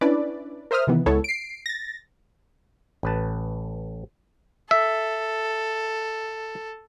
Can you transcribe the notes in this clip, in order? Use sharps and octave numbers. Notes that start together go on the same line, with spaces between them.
C#4 D4 E4 B4 D5
A#4 C5 E5 D#6 F6
C3 D#3 E3 B3
C#2 G#3 B3 E4 A4 C#5
C7 D7
A6 A#6
A1 B4 A5
A4 E5